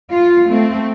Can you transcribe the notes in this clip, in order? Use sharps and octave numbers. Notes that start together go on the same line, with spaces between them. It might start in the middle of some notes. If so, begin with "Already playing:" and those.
F4
A3 C4